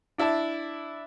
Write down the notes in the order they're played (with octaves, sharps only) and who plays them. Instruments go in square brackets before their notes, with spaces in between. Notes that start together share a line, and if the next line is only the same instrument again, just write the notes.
[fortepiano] D4 E4 D5 A5